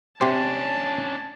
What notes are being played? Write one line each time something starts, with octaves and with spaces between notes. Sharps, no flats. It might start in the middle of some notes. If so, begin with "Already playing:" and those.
C3 C#4 D4 G4 C5 A5